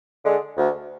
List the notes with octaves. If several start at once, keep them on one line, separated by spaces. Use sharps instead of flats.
D3 G#3
D2